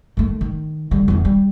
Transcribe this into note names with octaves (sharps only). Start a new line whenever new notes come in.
D#3 A3
D#3
D3 G3
E2 D3
G3